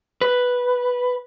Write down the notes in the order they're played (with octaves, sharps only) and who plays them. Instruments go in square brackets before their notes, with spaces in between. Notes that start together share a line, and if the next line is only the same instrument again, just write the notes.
[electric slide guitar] B4